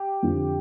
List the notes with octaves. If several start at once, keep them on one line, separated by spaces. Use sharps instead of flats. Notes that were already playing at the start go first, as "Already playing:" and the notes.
Already playing: G4
F2 D3 F3